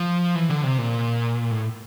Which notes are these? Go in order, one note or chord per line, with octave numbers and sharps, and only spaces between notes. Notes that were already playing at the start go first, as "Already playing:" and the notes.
Already playing: F3
E3
D3
C3
A#2
A2